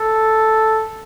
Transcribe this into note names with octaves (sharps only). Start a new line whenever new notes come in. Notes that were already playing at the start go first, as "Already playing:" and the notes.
Already playing: A4